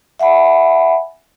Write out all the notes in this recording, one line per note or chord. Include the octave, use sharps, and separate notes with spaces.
E5 F#5 G#5 B5